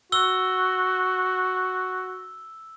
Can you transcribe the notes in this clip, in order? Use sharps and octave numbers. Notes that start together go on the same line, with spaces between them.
F#4 E6 G7